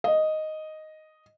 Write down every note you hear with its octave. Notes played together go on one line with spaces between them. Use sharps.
D#5